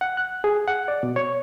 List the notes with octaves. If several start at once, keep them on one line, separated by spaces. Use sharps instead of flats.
F#5
F#6
G#4
F#5
D5
B2
C#5